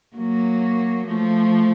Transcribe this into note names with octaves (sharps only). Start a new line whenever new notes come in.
F#3 A#3
F3 A3